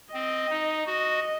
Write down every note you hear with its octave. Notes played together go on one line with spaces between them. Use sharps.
C4 D#5
D#4
F#4 D#5